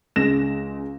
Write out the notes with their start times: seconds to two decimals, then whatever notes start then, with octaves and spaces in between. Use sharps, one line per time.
0.16 C#2 G#3 A#6 E7